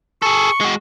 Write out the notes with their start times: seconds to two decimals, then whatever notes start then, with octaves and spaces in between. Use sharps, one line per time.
0.22 G#4 A4 C#6
0.61 G#3 F#4